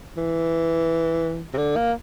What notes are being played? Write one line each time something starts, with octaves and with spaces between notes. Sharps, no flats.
E3
C3
D3
A#3